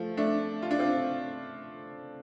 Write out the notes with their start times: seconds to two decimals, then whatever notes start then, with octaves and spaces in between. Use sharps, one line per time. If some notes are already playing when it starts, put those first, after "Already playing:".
Already playing: F3 A3
0.17 A3 D4
0.62 F4
0.71 D4
0.79 C4 F4